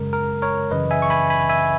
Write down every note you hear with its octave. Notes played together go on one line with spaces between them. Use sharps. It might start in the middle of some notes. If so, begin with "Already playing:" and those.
Already playing: F#2 C#3 G#3 A#4
A#4
A#4 C#5
F#2 C#3 E3 B4 D#5
E5 G#5
C#6
G#5 B5
G#5 B5
E5 G#5